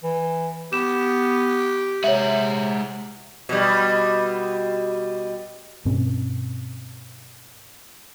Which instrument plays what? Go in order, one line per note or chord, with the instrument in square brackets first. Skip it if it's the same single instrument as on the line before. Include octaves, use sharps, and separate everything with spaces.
[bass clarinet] E3
[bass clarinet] B3 [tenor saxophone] G4 [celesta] E7
[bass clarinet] C3 [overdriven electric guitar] G#3 F#5 [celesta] C#5 E5
[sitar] B2 G3
[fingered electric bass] G2 B2 C4 C#4